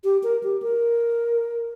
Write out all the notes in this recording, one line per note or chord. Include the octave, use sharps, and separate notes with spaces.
G4
A#4
G4
A#4